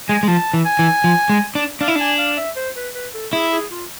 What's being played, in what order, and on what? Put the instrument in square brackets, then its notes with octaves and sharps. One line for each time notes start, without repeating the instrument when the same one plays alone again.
[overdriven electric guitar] G#3 [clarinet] G#5
[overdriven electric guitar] G#3
[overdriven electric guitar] F3 [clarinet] A5
[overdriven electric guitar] E3
[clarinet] G#5
[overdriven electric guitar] E3
F3
G#3
D4
[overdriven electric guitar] D4 [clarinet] F5
[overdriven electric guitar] E4
[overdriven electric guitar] D4 [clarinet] G#5
[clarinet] F5
E5
C5
B4
B4
A4
[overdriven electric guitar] E4 [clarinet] G#4
[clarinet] G#4
F4